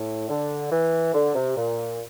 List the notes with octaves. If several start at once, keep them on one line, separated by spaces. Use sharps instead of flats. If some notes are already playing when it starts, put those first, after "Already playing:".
Already playing: A2
D3
E3
D3
C3
A#2